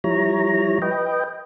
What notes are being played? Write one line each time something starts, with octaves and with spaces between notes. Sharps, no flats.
F3 G3 E4 C#5 A#5
B4 D#5 G5